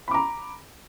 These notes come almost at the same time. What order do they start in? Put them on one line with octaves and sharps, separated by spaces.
B5 D6 A#5